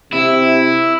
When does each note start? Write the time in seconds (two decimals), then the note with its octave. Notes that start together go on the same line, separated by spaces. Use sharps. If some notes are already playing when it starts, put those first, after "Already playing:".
0.13 C3 E4